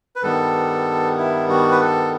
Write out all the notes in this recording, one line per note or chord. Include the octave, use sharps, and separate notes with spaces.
B4
G2 D#3 G3 B3 A4
E4
F#4
B4
A4